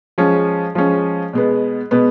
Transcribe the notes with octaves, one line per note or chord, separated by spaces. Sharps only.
F3 G#3 C#4
F3 G#3 C#4
B2 G#3 B3
B2 G#3 B3